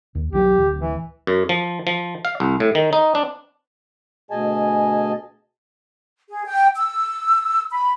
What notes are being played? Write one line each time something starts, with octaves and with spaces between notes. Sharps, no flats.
D#2
B1 E3 F#3 G4
D1
E3
F#2
F3
F3
F5
C2
A2
D#3
D#4
D4
D2 B2 G#4 D#5 G#5 A5
G#4
G5
E6
B5